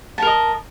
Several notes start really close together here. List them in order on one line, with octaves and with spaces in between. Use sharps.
A5 A#4 D#5